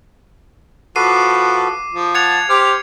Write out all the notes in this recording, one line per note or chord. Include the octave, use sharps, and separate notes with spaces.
F3 F#4 A4 B4 D6 C7 D#7
F3
F#5 A5 G#6 C#7 F7
G4 C5 D6 F6